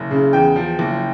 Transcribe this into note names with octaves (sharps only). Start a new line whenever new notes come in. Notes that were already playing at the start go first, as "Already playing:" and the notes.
Already playing: F#1
C#3
E2 G5
F3
F#1